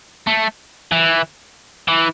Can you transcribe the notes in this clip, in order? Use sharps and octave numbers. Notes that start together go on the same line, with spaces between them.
A3
E3
E3